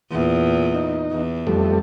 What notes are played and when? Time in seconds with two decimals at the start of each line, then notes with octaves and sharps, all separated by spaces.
0.11 E2 A#2
0.74 D#4
1.11 E2
1.47 F2 G3 A3